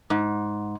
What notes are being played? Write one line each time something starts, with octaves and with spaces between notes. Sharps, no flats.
G#2